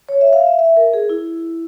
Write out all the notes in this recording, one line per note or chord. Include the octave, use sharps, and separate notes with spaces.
C#5
E5
F5
E5
E5
A#4
G#4
E4